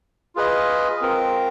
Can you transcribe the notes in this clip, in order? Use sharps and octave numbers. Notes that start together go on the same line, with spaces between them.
F4 G#4 B4 D#5
C4 F4 A#4